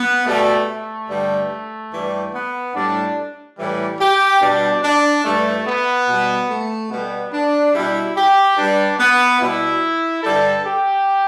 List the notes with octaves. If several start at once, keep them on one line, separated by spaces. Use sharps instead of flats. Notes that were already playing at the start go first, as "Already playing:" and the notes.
Already playing: B3
B2 G3 A3
A3
G2 D3 G3
G2 E3 G3
B3
A2 G3 D4
A2 E3 G3
G4
B2 G3 D4
D4
G2 E3 G3 A3
B3
B2 G3
A3
B2 G3 B3
D4
B2 G3 E4
G4
G2 G3 D4
B3
B2 G3 E4
G2 D3 G3 A4
G4